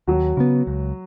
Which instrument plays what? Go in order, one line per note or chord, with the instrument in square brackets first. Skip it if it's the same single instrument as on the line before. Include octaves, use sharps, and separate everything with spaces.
[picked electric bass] D#2 [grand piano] F#3 F#4
[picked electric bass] C#3 B3
C#2